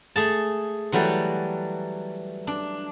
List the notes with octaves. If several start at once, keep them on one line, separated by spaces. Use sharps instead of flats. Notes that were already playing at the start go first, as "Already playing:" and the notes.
A3 G#4 A5
E3 F#3 G3 A3
D4